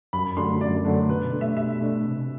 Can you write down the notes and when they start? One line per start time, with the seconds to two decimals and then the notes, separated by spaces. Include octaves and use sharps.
0.13 F#2 B5
0.37 D3 F#3 A3 D4 C6
0.61 F#2 D5
0.85 D3 F#3 A3 D4
1.09 B2 B4
1.33 A3 D4
1.41 E5
1.57 B2 E5
1.81 A3 D4
2.04 C3